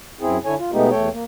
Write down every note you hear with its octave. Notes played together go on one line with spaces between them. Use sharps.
F#2 C4 E4 G#4
D3 E4 A4 C#5 G#5
F4
B2 G#3 A3 B3 D#4 G4
E2 A3 A4 C#5 G5
A#3